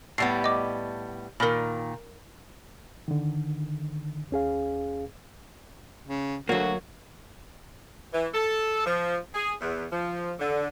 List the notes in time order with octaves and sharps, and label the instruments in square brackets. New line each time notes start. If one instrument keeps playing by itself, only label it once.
[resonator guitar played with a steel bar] A2 G3 B3 [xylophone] C7
[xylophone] D#5 D6
[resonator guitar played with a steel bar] A#2 D#3 [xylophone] A#4 B5
[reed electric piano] D3 D#3
D#2 C#4 G#4 F5
[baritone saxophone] C#3
[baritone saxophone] D2 [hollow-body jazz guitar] F#3 A#3 [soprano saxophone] F#4
[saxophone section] E3
A4
F3
G#4
E2
F3
D3